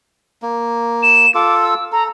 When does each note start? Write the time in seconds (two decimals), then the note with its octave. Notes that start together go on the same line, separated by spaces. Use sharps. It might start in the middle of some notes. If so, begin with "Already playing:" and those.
0.42 A#3
1.03 E7
1.35 F4 A4 D6
1.63 E6
1.92 A4 A#5